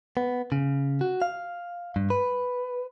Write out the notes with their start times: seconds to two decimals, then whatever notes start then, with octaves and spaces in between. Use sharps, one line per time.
0.17 B3
0.52 C#3
1.01 F#4
1.22 F5
1.96 G2
2.10 B4